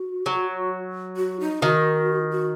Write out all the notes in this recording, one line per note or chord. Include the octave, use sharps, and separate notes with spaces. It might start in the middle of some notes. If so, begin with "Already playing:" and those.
Already playing: F#4
F#3
F#4
D#4
D#3 F#4
F#4